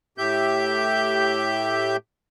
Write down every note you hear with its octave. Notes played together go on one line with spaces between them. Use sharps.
A2 G4 E5 G6